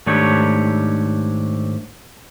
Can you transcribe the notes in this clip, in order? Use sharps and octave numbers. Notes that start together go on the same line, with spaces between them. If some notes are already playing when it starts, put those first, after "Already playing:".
G#2 D#3 A3 D4 G4 C#5